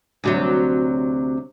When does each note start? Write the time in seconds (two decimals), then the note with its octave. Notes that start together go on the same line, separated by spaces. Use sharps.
0.24 D2 C3 F#3